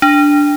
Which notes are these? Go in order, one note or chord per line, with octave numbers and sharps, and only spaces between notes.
D4